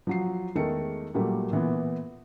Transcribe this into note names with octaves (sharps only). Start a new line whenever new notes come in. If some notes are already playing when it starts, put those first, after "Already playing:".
F3 F#3 C7
E2 D#3 G#3 A3 A#4 C#7
A#2 F#3 G3 A3 A#3
A#2 E3 B3